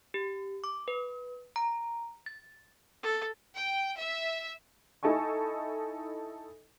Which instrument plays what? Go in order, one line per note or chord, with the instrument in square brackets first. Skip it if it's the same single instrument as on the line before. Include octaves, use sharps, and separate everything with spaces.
[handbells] G4
D6
B4
A#5
A6
[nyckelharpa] A4
[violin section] G5
E5
[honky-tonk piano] D#4 E4 A4 D#5 G#5 C#6